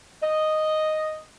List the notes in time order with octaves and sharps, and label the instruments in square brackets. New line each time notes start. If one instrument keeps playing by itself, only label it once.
[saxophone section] D#5